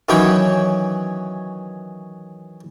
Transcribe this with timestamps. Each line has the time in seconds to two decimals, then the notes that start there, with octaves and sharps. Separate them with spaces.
0.09 D#3 E3 F#3 C#4 C#5 G5